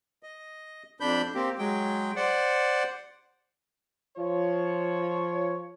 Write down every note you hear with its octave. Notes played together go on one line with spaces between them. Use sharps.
D#5
F2 D4 B5 G6
A#3 C4 G4
F#3 G#3 G5
C5 D5 F#5
F3 F4 C#5